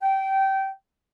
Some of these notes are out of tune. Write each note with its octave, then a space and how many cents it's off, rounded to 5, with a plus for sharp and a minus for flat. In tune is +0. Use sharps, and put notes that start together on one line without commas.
G5 -20